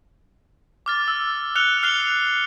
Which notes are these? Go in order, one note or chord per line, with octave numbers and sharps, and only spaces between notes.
D6 F6 A6
E6
F6 F#6 C#7 F7 G7
F6 F#6 C7 C#7 F7 G7